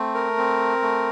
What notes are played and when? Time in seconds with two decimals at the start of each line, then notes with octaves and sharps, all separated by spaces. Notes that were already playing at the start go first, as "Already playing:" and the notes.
Already playing: A3 C4
0.14 A#4
0.37 C4
0.82 A3